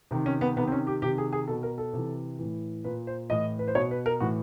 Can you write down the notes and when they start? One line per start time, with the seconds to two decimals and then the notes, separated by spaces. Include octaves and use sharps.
0.11 C3 D#3
0.26 C#4
0.41 B3
0.56 C3 B3
0.60 D#3
0.68 C4
0.72 C#4
0.87 G4
1.02 C3 D#3 G4
1.18 G#4
1.33 G#4
1.48 B2 A4
1.63 A#4
1.78 A4
1.93 C3 E3
2.39 A2 E3
2.84 A#2 B4
3.07 C5
3.30 A2 E3 D#5
3.59 B4
3.68 C5
3.75 B2 C#5
3.91 B4
4.06 A#4
4.20 A2 E3 F#4